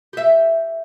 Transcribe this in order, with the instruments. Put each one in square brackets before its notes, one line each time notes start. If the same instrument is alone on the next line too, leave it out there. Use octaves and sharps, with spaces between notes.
[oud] G4 E5